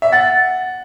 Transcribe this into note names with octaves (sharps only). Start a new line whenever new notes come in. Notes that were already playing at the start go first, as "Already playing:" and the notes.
E5
F#5 A6